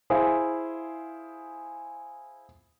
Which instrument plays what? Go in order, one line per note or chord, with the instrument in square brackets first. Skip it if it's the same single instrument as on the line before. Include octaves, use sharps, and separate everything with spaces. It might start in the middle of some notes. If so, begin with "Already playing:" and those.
[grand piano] E4 G#4 C5 F5